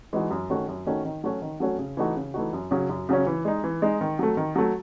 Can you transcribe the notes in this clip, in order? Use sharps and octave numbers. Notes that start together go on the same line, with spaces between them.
E3 G#3 D#4 F#4
F#2
D#3 A3 C#4 F#4
F#2
D#3 A3 C#4 F#4
D#3
F#3 A3 C#4 F#4
D#3
F#3 A3 C#4 F#4
C#3
E3 A3 D#4 F#4
C#3
E3 A3 D#4 F#4
F#2
C#3 F#3 C#4
F#2
C#3 F#3 C#4
E3
G#3 D#4
E3
G#3 D#4
D#3
F#3 A3
D#3
F#3 A3